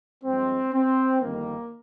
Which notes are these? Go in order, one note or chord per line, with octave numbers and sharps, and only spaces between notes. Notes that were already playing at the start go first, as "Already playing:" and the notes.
G2 F3 G#3 C4
C4
G1 F2 D#3 G3 A#3